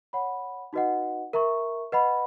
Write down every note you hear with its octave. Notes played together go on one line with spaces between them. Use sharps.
C#5 F#5 B5
D#4 F#4 B4 D#5 F#5
A#4 E5 A#5 C#6
B4 D#5 F#5 B5